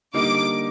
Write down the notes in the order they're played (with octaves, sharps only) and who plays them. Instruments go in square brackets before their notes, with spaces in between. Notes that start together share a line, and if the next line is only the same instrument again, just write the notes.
[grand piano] D3 G3 A#3 D#4 [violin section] D6